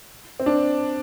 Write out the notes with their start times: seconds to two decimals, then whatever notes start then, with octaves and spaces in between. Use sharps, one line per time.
0.40 C4
0.46 D4